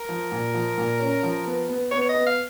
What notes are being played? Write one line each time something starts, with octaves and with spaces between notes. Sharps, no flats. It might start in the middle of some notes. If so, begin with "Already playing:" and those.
Already playing: A#4
F3
A#2
F3
A#2
C#4
F3
B3
B3
B3 C#5
C#5
D#5
B3
F5